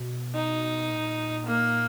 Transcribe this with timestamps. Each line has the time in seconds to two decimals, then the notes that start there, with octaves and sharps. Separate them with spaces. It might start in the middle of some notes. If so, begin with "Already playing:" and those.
Already playing: B2
0.35 D#4
0.91 A#2
1.47 A#3